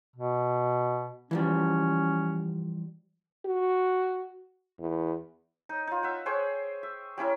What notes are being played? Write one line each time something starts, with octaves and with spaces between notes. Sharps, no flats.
B2
E3 F3 G3 C#4
F#4
E2
D#4
D#4 F4
E5 F#5
G#4 C5 C#5 G5
E5
G3 C#4 E4 A#4